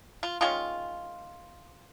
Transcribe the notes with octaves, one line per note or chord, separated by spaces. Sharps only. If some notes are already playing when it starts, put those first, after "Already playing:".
F4
D#3 G#3 C#4 F4